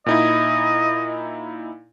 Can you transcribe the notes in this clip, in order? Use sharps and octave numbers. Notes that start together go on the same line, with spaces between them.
A#2 D#4 E4 D#5